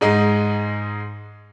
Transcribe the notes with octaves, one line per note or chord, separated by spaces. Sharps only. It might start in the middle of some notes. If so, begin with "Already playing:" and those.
G#2 G#3 D#4